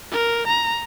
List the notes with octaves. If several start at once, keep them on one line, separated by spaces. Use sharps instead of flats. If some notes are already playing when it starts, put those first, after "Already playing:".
A#4
A#5